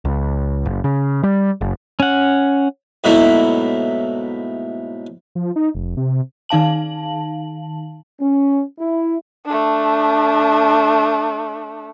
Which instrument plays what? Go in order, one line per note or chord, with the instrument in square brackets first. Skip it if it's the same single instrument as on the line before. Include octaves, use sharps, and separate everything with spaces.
[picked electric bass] C#2
F#1
C#3
G3
F#1
[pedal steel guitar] C#4 F#5
[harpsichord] G#2 B2 F#3 A3 A#3 E4
[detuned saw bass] F3
D#4
F1
C3
[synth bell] D#3 D#4 F5 A5 F#7
[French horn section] C#4
E4
[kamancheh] A3 D4